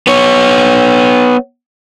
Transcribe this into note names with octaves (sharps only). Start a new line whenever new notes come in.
B3 C#5